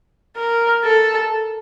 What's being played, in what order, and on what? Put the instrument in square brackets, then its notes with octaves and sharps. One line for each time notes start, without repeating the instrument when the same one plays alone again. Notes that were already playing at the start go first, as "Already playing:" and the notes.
[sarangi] A#4
A4